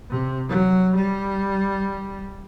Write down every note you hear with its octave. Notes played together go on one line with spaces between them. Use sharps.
C3
F#3
G3